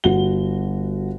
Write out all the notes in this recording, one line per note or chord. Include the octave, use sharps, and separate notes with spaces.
G1 F#4 G7